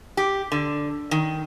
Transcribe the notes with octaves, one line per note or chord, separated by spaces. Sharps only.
G4
D3
D#3